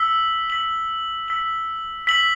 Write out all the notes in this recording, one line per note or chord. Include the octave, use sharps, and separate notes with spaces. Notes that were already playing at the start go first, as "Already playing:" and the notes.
Already playing: E6 B6 F#7
E6 B6 F#7
E6 B6 F#7
E6 B6 F#7